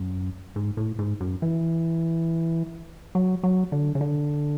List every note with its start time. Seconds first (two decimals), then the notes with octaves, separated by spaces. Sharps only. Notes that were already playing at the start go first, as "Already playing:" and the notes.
Already playing: F#2
0.56 G#2
0.77 A2
0.99 G#2
1.20 F#2
1.42 E3
3.15 F#3
3.43 F#3
3.72 D3
3.95 C#3
4.01 D3